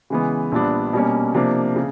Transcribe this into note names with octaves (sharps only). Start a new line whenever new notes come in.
C#3 E3 G#3 B3
A#1 A#2 G3 B3 D4
B2 G3 A#3 C#4
C3 F3 A#3 D4
C#3